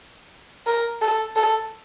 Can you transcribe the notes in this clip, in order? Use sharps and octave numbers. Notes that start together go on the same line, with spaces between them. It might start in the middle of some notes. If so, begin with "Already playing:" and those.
A#4
A4
A4